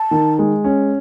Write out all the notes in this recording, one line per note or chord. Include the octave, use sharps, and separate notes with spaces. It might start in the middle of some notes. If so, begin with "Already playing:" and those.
Already playing: A5
D#3
G#3
C#4